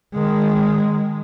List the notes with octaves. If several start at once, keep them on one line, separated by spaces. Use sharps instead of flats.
D#3 G#3